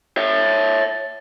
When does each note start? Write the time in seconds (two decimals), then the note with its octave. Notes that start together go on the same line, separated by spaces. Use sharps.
0.17 C#5 E5